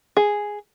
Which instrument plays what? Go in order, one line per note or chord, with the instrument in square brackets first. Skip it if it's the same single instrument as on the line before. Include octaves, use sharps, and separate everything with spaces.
[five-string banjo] G#4